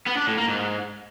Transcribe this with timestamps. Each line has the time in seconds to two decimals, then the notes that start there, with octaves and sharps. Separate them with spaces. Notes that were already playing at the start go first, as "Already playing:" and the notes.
0.06 B3
0.17 D4
0.27 A2
0.38 A#3
0.48 G#2